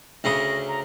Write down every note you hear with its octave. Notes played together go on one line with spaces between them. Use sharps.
D2 C#3 D#6 A#6
A#5